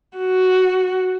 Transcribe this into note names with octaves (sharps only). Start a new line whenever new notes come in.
F#4